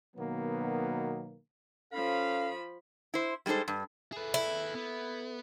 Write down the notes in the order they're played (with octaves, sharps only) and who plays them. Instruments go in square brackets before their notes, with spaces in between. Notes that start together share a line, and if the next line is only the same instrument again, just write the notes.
[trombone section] B2 D#3 F#3 A#3 B3
[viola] F3 B5 [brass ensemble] C#4 A4 F5
[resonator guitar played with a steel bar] E4 C5
G3 G#3 D#4 A4 C5
G2
[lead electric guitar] G#4 B4 [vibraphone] A4 E5
[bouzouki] E4
[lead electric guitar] B3